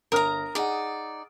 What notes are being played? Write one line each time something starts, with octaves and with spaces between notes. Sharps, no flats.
G1 A#4 A#5 D#6 F6
D#4 G#4 D5 F#5